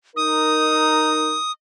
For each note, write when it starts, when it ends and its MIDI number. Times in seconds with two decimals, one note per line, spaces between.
0.16 1.35 63
0.16 1.35 70
0.16 1.52 87